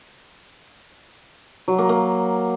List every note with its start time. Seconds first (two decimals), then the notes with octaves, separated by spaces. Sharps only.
1.68 F#3
1.78 A#3
1.89 A#3